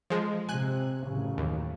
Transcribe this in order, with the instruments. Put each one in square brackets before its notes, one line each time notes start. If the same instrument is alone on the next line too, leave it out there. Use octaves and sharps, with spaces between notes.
[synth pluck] F3 G#3
[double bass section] C3 [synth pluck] G#5 F#6
[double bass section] A1 F#2 C#3
[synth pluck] D#2